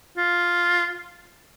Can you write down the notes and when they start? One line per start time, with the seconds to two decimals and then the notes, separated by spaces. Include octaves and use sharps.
0.17 F4